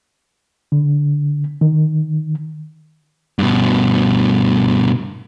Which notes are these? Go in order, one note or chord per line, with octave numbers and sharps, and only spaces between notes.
D3
D#3
G2 B2